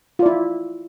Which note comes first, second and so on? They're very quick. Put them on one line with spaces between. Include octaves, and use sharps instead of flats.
F4 D5 E4